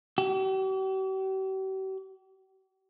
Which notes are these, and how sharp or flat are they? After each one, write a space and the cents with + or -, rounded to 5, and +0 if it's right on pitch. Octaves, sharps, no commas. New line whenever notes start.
G4 -45